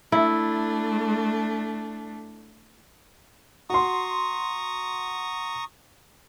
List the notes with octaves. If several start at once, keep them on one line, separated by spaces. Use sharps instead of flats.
A3 D4 E4
F#4 A#5 C6 C#6 D#6